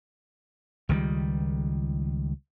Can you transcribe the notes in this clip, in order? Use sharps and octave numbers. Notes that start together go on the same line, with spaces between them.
C#2 D#3 F#3 G3